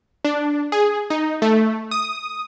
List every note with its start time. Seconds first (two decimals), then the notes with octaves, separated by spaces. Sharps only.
0.25 D4
0.72 G#4
1.10 D#4
1.42 A3
1.91 D#6